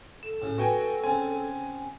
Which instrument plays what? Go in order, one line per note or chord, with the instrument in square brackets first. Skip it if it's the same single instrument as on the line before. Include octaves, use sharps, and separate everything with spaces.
[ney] A4 [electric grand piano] E7
[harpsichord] A2 C#3
[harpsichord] B3 [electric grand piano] F#4 G5 G#5
[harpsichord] C#3 C4 [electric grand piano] G#5